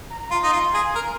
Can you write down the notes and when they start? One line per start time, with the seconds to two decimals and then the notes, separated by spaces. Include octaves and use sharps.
0.10 A#5
0.22 A#5
0.31 F4 C6
0.43 D#4
0.53 F4
0.74 G#4
0.95 A#4